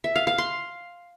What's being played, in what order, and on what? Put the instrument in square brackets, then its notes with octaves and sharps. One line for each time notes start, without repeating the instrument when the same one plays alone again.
[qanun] E5
F5
F5
C6